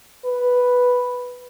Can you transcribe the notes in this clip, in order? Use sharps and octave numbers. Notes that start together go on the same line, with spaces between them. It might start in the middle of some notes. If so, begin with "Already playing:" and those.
B4